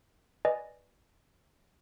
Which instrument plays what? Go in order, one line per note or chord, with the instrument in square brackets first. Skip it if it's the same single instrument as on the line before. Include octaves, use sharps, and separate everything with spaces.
[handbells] B4 D5 D#5 G#5